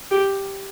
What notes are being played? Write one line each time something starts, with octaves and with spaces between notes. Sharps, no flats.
G4